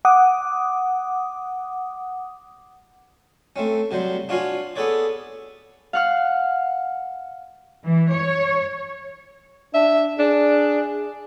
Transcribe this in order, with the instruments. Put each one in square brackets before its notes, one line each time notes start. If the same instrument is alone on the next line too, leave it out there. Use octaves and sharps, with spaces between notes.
[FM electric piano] F#5 D6 D#6
[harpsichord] A3 C4 C#4
C3 F#3 G3 C5
D4 F4 F#4 C#5 F5 G#5
B3 G#4 A4 B4 C#5 D5
[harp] F5 F#5 F6
[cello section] E3
C#5
[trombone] D4 [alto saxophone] E5
[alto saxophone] D4 [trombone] G#4